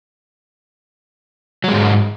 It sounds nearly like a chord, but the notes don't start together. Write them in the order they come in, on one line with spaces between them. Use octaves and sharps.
F#3 G#3 G#2